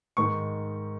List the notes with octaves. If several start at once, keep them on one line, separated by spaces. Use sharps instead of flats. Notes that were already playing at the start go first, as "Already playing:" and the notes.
G#2 D#3 C#6